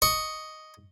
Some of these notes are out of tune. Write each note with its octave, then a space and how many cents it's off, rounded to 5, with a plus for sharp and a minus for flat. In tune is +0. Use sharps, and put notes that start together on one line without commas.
D#5 +0 C#6 +5